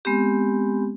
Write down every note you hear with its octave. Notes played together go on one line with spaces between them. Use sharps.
G#3 B3 C4 G4